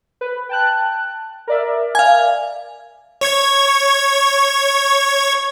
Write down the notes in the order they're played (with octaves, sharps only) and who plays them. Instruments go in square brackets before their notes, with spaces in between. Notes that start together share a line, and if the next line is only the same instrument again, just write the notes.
[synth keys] B4
G5 A5 F#6
A#4 D5 E5
[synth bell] F5 G#5
[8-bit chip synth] C#5 C#6 G#6